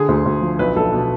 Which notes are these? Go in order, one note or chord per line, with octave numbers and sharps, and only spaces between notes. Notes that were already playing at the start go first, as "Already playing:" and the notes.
Already playing: D3 G#4
D2
D2
F3
B1 B4
B1 A4
B2